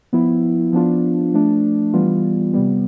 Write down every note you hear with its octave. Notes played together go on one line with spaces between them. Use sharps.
F3 B3 E4
F3 B3 D4 F4
F3 A3 D4
E3 G3 B3 F4
C3 G3 B3